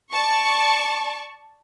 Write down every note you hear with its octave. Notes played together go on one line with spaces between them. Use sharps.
D5 A5 C#6